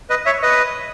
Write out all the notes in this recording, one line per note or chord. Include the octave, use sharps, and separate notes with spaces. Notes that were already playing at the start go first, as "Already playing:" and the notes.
B4 D#5
C#5 E5
B4 D#5